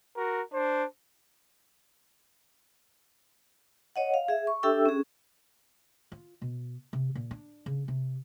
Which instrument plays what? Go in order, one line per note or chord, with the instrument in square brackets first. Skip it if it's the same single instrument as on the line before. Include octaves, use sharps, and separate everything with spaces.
[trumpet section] F#4 A#4
D4 C5
[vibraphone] C#5 D#5 F#5
F5
G#4 E5
C#6
D4 G4 A4 E5 G5 E6
C#4 G#4
[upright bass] F4
B2
C3
A#2
D4
C#3
C3